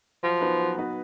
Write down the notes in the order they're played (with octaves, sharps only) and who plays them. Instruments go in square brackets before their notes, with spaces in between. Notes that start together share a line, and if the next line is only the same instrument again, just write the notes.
[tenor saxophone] F3 [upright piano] F#3
[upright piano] B3 D#4 F#4 B4
F#3
B3 D#4 F#4 B4